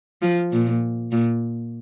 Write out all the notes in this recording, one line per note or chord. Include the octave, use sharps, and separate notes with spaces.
F3
A#2
A#2